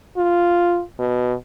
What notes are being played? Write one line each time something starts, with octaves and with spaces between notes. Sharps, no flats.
F4
B2